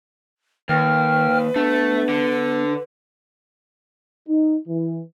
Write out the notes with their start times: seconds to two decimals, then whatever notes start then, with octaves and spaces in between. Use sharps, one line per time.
0.69 D#2 D#3 B4 G5 F6
1.56 A3 B3 D4
2.09 D3
4.28 D#4
4.67 E3